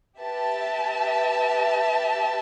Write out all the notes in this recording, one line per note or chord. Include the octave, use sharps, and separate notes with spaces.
G4 B4 E5 A5